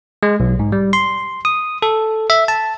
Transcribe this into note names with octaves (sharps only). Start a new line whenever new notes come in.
G#3
B1
G#2
G3
C6
D#6
A4
E5
A5